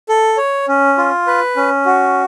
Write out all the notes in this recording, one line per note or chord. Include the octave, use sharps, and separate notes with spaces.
A4
C#5
C#4
F4
B4
C#4
F#4